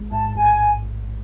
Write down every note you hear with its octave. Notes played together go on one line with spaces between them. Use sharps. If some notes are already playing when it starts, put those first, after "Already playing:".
Already playing: A1 G#3
G#2 A5
A1 G#5